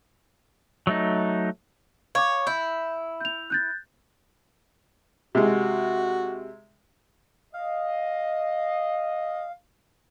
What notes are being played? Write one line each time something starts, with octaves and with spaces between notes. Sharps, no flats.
F#3 A3 D#4
C#5 F5 D6
E4 G6
G6 F7
F#6 G6 A6
C3 G#3 F#4
D#5 F5